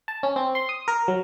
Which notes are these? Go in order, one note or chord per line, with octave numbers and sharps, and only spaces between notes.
A5
C#4
C4
C6
D#6
A#4
F#3